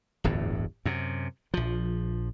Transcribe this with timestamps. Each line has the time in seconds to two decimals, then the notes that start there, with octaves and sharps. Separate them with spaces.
0.24 D1 G1 E2 A2
0.85 F#2 C3
1.54 A#1 F3